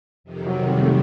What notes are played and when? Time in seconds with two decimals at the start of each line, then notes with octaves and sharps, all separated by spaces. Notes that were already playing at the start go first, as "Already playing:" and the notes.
0.24 F2 C3 D#3
0.46 F#3
0.68 G3
0.82 A3